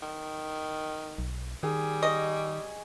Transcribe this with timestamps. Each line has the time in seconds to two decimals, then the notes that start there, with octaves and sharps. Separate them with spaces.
0.02 D#3
1.18 B1
1.63 D#3 G3 G#4
2.02 D#5 C#6